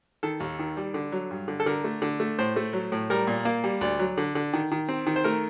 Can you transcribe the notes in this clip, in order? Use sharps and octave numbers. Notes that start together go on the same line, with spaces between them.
D#3 A4
D#2
D#3
G3
D3
F#3
G2
D3
A4
D3 A#4
A3
D3
A3
A2 C5
A3
F#3
A2
G3 A#4
A#2
A#3
G3
D2 D5
F#3
D3
D3
D#3
D#3
C4
D#3
C5
A3 A#4